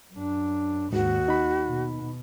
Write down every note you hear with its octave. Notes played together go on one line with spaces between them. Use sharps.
F#2 D4
D#2 G#2 D#3 F#4
D#4 B5
B2